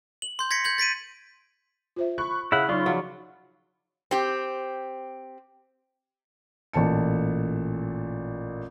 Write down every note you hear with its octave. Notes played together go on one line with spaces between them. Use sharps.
F#7
C6 G6
G#6 A#6 B6 C#7
G6 G#6 F#7
A6 B6 D7 D#7
F4 C5 E5
B5 C#6 F#6
C#3 E4 G#4 C#5 F5 F#5 F6
F#3 D#4 F4 D5 B5 C#6
F3 F#3 F5
C4 G4
A1 A#2 A5 C#7